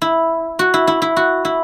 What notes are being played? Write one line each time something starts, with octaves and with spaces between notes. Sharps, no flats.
E4
F#4
E4
E4
E4
F#4
E4